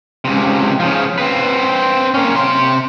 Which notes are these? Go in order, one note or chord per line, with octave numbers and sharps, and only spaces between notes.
C#2 C3
C#3 F3
C4 B4
A#3 C#4
C3 C6